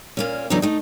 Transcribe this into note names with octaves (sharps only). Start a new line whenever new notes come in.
A#2 A#3 C#4
D3 E3 F#3 B3 D4 D#4
A3 D#4